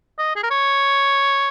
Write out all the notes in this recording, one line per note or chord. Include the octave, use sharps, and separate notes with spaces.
D#5
G#4
A#4
C#5